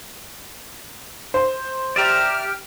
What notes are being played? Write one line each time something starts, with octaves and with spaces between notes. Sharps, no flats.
C5
G4 D5 E5 A#5 F6